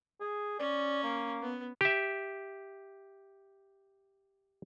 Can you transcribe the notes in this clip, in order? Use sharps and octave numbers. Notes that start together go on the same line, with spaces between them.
G#4
C#4 D5
A#3
B3
G4 E5